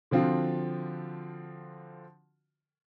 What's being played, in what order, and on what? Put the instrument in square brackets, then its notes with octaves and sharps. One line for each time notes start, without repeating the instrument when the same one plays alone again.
[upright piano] D3 F3 C4 F4 F#4